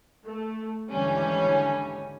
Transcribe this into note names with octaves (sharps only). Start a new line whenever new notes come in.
A3
D#2 G#2 D3 E3 G3 C#4